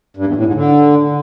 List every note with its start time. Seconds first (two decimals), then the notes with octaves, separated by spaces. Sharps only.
0.17 G2
0.26 E2
0.36 A2
0.45 G#2
0.55 D3